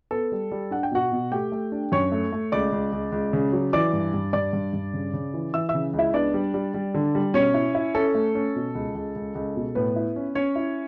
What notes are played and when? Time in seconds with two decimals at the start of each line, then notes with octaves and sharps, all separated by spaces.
0.11 B3 A4
0.32 G3
0.51 G3
0.71 D4 F#5
0.83 G5
0.91 B2 F#4 F#5
1.12 B2
1.32 A3 G4 G5
1.52 A3
1.72 D4
1.92 F#2 C#5 C#6
2.12 A3
2.32 A3
2.52 C#2 D5 D6
2.72 C#2
2.92 C#2
3.12 C#2
3.33 C#3
3.52 F#3
3.73 E3 D5 D6
3.93 G2
4.14 G2
4.33 G2 D5 D6
4.53 G2
4.73 G2
4.93 C#3
5.13 C#3
5.34 E3
5.54 E3 E5 E6
5.69 E5 E6
5.74 C#3
5.93 C#2
5.99 E4 E5
6.13 B3 D4 D5
6.34 G3
6.54 G3
6.74 G3
6.94 D3
7.15 G3
7.34 B2 C#4 C#5
7.54 E4
7.75 E4
7.95 C#4 A4
8.15 A3
8.35 C#4
8.56 B2
8.75 C#2
8.95 C#2
9.16 C#2
9.35 C#2
9.56 B2
9.75 A2 B3 B4
9.96 E4
10.16 C#4
10.35 C#4 C#5
10.56 E4